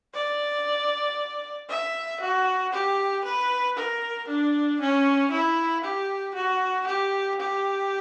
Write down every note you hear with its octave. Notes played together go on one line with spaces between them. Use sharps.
D5
E5
F#4
G4
B4
A#4
D4
C#4
E4
G4
F#4
G4
G4